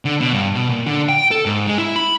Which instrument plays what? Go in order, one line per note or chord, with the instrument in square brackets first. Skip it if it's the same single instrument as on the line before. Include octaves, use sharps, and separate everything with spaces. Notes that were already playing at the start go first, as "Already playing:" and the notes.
[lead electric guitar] D3
B2
G2
B2
A#2
D3
G5
A4
G#2
G#3
E4
B5